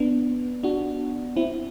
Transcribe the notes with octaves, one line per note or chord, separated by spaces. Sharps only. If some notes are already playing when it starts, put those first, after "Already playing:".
Already playing: B3 D4
D4 F#4
C4 E4